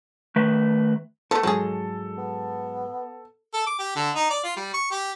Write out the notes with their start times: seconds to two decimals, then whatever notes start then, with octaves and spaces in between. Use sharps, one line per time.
0.36 D#3 A3 B4
1.31 F3 A3 B3 A4
1.43 G#2 F3 F#3 G#3 G#4
2.18 B3
3.54 A4
3.67 D6
3.79 G4
3.96 D3
4.15 D#4
4.30 D5
4.44 F4
4.57 G3
4.74 C#6
4.91 G4